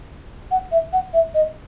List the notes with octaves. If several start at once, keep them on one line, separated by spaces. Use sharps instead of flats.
F#5
E5
F#5
E5
D#5